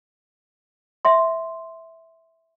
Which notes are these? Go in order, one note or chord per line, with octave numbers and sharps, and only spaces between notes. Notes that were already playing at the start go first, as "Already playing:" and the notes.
E5 C6